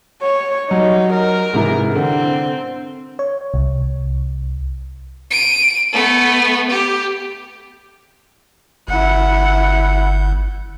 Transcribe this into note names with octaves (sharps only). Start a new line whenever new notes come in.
C#5
F#3 G3 D#4
A#4
G#2 C3 E3
D3 C4
C#5
C2
D7 D#7
A3 B3
G4
G1 E4 F#5